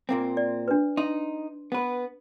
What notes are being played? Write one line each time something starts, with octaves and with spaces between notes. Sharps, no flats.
A#2 A#3 C4
D5
D4 B4
D#4 C6
B3 B4